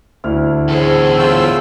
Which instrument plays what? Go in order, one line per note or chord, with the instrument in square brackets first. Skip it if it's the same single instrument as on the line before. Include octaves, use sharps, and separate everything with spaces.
[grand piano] D2 E4 F6
[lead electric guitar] E2 A4 [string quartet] G#4 C5 C#5
[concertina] F4 G5 E6